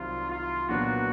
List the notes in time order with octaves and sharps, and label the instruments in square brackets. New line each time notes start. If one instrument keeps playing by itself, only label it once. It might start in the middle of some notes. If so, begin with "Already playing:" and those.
Already playing: [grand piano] C2 C3 D#3 F#3 [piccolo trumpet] F4
[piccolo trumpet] F4
[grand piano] A#2 F#3 B3 D4 [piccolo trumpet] F#4